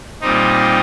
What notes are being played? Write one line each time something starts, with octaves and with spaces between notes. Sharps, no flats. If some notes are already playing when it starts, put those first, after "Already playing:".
A#2 G3 C4 D#4